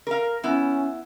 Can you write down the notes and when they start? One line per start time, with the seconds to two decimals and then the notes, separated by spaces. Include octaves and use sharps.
0.07 A#4 F5
0.43 B3 C#4 E4